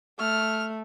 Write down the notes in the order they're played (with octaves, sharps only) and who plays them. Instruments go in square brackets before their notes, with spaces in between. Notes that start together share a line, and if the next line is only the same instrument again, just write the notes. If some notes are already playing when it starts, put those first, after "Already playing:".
[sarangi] A3 [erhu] F6